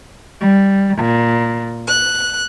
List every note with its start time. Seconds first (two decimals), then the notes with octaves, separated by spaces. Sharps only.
0.39 G3
0.97 A#2
1.87 F#6